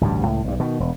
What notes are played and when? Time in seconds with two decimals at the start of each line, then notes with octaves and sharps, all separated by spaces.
0.01 A1 D2 G2 G3
0.25 C#2 A2
0.44 B1 G2
0.60 B2 D#3
0.80 E1